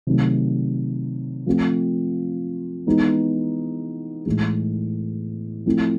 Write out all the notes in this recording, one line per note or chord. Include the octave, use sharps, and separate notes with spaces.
C3 D#3 F#3 A3
F3 A3 C4 F4
E3 G#3 B3 D#4
A2 E3 G#3
F3 A3 C4 E4